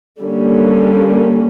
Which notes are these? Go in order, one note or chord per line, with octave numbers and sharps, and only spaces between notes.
D3 G3 A#3 C#4